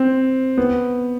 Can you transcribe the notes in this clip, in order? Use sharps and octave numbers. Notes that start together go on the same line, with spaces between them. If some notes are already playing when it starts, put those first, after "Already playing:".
Already playing: C4
B3